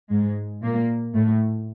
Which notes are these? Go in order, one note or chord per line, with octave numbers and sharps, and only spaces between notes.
G#2 G#3
A#2 A#3
A2 A3